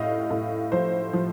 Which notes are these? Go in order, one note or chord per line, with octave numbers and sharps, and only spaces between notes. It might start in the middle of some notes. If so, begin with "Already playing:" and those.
Already playing: A2 D#5 F5
A2
F3 C5
F3